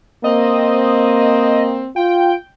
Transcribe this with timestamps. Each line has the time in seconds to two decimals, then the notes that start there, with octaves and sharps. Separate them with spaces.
0.24 A#3 C4 D#5
1.96 F4 G5